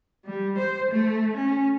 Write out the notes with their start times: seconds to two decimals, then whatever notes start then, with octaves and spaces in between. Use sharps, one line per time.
0.25 G3
0.58 C5
0.91 A3
1.36 C#4